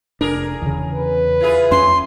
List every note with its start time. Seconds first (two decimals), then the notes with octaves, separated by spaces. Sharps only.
0.21 F1 D4 G#4 A#4
0.61 E2 C#3
0.94 B4
1.40 E4 F4 G#4
1.71 F2 C#4 C6